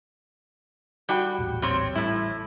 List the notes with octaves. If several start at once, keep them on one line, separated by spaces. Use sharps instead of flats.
G3 F#4 G5
D#1 A1
G3 C4 C#5
A1 A2 G3 E4